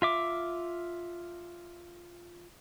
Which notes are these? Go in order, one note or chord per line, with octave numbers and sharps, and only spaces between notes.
F4 E5 D6